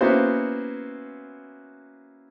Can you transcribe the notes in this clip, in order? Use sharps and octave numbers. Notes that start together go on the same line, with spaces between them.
A#3 B3 C#4 E4 F#4 C5